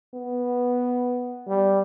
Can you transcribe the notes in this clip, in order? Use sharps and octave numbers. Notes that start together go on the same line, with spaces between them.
B3
G3